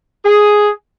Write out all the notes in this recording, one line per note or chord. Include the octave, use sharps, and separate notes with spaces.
G#4